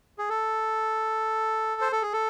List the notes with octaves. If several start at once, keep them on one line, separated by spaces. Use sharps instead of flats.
G#4
A4
C5
A4
G#4
A4